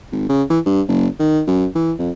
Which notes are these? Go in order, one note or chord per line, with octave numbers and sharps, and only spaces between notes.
G#1
C#3
E3
G2
F#1
D#3
F#2
E3
F2